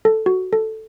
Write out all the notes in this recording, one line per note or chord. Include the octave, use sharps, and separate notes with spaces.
A4
F#4
A4